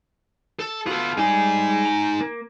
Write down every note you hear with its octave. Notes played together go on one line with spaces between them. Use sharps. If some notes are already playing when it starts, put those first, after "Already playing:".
A4
B3 F4 F#4 A4
G3 G#3 D#4 G#4 G#5
A#5
A#3